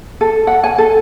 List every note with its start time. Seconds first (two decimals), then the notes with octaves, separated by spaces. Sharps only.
0.21 A4
0.47 F#5
0.64 G#5
0.78 A4